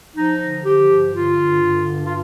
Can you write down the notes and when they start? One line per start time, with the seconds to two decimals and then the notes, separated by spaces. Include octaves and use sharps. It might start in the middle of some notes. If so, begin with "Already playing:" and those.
0.15 F3 D#4
0.40 D3
0.64 F3 G4
0.89 G2
1.14 D3 F4
1.38 G2
1.63 D3
1.87 G2
2.05 F4